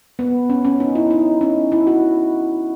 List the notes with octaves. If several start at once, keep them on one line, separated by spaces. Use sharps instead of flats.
B3
C#4
C#4
D#4
E4
D#4
C#4
E4
F#4